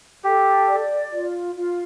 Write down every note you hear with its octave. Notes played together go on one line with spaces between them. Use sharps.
G4 A4
D5
F4
F4